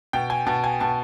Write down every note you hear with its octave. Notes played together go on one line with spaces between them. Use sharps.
B2 G5
G#5
B2 A5
G#5
B2 A5